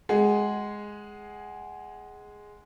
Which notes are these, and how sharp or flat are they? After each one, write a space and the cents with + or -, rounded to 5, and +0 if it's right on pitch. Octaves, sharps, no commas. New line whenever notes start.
G#3 +0 G#4 +0 F#5 +20